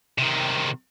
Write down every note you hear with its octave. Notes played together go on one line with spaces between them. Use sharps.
C3 D#3